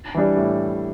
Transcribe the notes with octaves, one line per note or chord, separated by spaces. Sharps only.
E3 G3 D4
A2